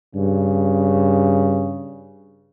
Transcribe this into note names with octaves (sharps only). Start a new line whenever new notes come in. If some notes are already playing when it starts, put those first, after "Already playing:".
G2 C#3